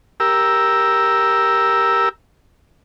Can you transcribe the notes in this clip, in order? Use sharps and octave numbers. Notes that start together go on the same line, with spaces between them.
G4 A#4 E6